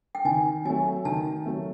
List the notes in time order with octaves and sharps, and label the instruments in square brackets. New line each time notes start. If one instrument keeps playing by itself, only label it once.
[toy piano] G5
[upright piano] D#3 [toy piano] G#5
[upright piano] F#3 A3 [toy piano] G#5
[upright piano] D#3 [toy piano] A5
[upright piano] F#3 A3